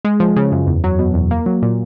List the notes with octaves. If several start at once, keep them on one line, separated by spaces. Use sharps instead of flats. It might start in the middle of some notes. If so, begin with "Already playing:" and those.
G#3
F3
C#3
F#2
E2
F#3
B2
E2
A#3
F#3
A#2